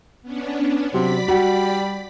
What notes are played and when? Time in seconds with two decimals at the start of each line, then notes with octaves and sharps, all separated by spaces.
0.23 B3 C#4 D4
0.94 C3 F#3 D5 B5 B6
1.28 G3 F#4